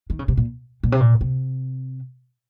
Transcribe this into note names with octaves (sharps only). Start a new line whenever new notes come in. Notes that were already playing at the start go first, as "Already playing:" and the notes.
D#3
C#3
C3
A#2
A#2
C3
A#2
C3